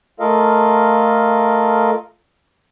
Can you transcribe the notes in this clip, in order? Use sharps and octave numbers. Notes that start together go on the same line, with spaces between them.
A3 F4 A4 A#4 D#5 F5